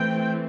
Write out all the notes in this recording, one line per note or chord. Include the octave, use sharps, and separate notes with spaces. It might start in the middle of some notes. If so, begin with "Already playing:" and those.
Already playing: E3 A3 C4 G5